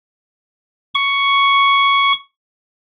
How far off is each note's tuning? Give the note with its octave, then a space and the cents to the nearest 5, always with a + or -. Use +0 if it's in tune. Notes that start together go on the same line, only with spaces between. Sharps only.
C#6 +5